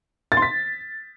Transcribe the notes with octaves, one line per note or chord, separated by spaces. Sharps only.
A6
C6
B6